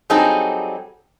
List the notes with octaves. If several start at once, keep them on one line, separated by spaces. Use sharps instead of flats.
F#3 G3 C4 D#4 G#4 A4